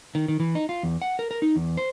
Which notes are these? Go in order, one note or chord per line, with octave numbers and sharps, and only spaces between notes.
D#3
D#3
E3
D#4
F4
E2
F#5
A#4
A#4
D#4
E2
C5